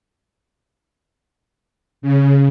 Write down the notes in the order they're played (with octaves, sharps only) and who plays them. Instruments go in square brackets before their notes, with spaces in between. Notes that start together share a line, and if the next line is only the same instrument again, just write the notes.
[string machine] C#3